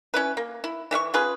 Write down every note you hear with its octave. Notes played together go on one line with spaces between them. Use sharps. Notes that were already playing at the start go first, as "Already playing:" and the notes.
C#4 E4 B4
A#3
E4
E3 E5 F5 C#6
C#4 F4 G#4 B4